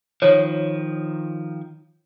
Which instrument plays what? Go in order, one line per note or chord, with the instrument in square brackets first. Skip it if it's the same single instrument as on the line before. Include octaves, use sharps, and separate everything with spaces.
[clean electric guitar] D#3 F3 [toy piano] C#5